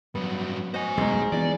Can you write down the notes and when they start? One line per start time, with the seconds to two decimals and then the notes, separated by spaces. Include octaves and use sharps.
0.15 G2 F#3 B3
0.74 F#4 C5 D#5 G#5
0.97 B1 E2 G#3 C#4 D#4
1.32 E3 A#3 B3 D5